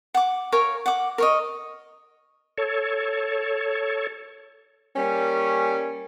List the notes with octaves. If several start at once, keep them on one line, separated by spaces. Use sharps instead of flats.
F#5 D6
A#4 C#5 F5 G#5
F#5 D6
A#4 C#5 D#5
A4 C#5
G3 A#3 C#4